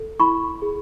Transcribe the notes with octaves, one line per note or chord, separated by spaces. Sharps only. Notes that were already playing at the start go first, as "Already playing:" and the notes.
Already playing: A4
E4 B5 C#6
G#4